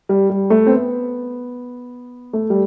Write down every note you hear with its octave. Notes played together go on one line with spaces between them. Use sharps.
G3
G3
A3
C4
B3
A3
G3